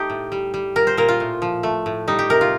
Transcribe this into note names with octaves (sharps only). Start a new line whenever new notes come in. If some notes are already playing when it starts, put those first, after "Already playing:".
Already playing: A3 D#4 G4
A2
G3
G3
A#2 A#4
C5
A#2 A#4
F4
A2
F3
A3
A2
G3 D#4
G4
C3 A#4
F4